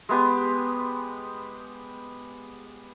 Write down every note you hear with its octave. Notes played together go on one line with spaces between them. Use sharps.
G#3 B3 G4